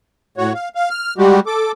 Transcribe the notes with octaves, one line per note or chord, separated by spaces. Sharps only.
A2 F#4 C#5
F5
F5
F6
G3 G#3 F#4 G4
A4 D6